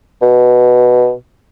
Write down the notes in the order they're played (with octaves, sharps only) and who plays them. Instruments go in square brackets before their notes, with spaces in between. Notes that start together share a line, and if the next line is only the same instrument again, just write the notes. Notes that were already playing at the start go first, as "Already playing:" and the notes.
[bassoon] B2